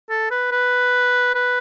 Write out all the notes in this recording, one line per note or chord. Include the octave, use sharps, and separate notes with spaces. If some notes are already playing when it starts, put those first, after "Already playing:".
A4
B4
B4
B4